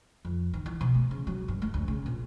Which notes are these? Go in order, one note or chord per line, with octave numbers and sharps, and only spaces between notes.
F2
D#3
E3
B2
A3
C#3
F#3
G2
A3
D2
C#3
A#2